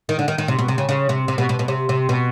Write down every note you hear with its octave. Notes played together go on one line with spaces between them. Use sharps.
D#3
D3
D#3
D#3
C3
B2
C3
C#3
C#3
C3
C3
B2
B2
B2
C3
C3
B2